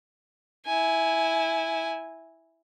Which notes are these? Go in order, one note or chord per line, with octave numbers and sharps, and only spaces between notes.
E4 G#5